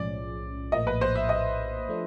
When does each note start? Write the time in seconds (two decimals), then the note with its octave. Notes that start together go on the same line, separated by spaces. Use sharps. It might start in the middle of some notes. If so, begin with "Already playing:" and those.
Already playing: B1 A2 F3 G#3 C#4 D5
0.72 A#1 A2 F3 A#3 D#5
0.87 B4
1.01 C5
1.15 E5
1.29 D#5
1.89 F3 A3 D4